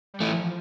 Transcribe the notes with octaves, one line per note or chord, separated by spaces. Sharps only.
G3
E3 F3 A3